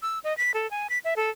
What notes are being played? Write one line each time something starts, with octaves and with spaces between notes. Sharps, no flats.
E6
D#5
B6
A4
G#5
B6
E5
A4